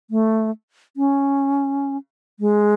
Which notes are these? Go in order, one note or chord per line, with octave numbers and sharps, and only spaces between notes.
A3
C#4
G#3